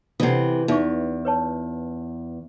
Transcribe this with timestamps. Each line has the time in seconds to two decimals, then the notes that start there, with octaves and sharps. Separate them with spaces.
0.20 C3 E3 A4 D5 F#5
0.68 E2 D#4 C#6
1.25 B4 C#5 A5